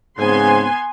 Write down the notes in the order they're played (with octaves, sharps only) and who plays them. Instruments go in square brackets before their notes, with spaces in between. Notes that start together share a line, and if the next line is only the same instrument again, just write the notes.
[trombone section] G#2 C#3 C4 [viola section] B3 G#5 C6